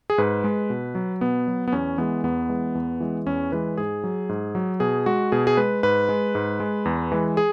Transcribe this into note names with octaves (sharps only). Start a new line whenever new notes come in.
G#4
G#2 B4
G#3
B2
F#3
B2 B3
F#3
B3
E2 C#4
E3 G#3 B3
E2 B3
E3 G#3
E2
E3 G#3
E2 C#4
E3 G#3 B4
G#2 G#4
F#3
G#2
F#3
B2 G#4
G#3 F#4
B2 G#4
G#4
G#3 B4
G#2 B4
G#3
G#2
G#3
E2
E3 G#3
G#4